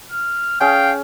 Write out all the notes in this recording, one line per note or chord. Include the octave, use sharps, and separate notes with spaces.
F6
C#4 G#4 F5 G5